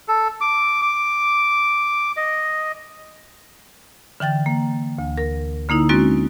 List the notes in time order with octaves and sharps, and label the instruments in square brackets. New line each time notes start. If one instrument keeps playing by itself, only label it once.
[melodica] A4
D6
D6
D#5
[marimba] D3 E3 G5 A6
A#3
D2
A#4
D3 A#3 D#4 E4
G#3 C4 C#4 F#4 A6